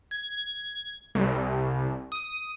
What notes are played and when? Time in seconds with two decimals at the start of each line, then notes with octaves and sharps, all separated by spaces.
0.11 G#6
1.15 C2
2.12 D#6